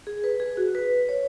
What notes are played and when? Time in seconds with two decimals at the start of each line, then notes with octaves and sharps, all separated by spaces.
0.07 G#4
0.24 B4
0.40 G#4
0.57 F#4
0.75 B4
1.09 C#5